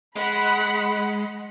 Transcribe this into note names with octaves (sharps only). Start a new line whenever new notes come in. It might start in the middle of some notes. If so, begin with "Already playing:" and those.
G#3 F#5 B5